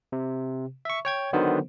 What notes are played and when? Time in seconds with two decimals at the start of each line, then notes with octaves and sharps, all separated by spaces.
0.12 C3
0.85 E5 C#6
1.05 C#5 G5 G#6
1.33 D3 D#3 F#3 B3 C5